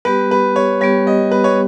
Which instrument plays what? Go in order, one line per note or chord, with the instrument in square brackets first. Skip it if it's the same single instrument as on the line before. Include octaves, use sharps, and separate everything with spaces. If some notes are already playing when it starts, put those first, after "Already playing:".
[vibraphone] G3 B3 G4 [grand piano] B4
[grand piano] B4
C#5
[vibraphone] G3 B3 G4 [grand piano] C#5
[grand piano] D#5
B4
C#5